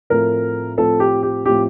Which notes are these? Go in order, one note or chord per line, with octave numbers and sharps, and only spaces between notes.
A2 F3 A3 C4 A#4
A2 F3 C4 A4
G4
G4
A2 F3 C4 G4